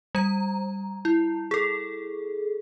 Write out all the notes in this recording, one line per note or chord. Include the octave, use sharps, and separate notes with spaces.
G3 A#5
E4
G#4 A4